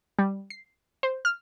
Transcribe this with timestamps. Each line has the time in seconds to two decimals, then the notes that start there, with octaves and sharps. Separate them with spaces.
0.19 G3
0.50 C7
1.03 C5
1.25 F6